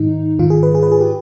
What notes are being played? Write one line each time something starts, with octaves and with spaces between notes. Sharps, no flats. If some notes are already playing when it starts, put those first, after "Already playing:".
Already playing: G#2 D#3 D#4
G#2 D#3 F4
G#4
B4
G#4
B4
G#4
G4